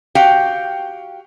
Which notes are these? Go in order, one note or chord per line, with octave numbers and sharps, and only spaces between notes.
F#4 G4 F5 G5